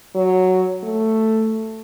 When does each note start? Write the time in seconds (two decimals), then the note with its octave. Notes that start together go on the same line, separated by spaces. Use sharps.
0.16 F#3
0.83 A3